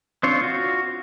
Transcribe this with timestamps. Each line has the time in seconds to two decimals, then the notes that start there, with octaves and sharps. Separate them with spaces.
0.23 C4 D4 F4 C5 C#5
0.41 F4 F#4